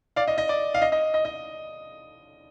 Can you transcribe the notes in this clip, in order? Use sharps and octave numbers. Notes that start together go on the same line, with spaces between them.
D5 F5
D#5
D#5
D5
F5
D#5
D#5
D#5
D#5